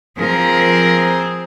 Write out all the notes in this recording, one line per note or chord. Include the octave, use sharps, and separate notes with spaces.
F3 C4 G#4 A#4